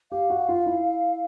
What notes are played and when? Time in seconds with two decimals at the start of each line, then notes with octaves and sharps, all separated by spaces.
0.11 G4 F5
0.30 F#4
0.49 F4
0.66 E4